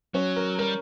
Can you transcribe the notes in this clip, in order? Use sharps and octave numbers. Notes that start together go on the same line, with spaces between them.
F#3 C#4 C#5
A#4
G3 A#4